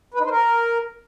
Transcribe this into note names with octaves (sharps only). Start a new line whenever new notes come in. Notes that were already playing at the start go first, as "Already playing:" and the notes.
B4
D#4
C5
A#4